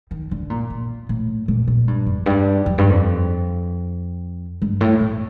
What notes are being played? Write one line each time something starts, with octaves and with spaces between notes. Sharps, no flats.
D#3
D3
A#2
A#2
A2
A#2
A#2
G2
F2
G2
F2
G2
F2
G2
A2
A2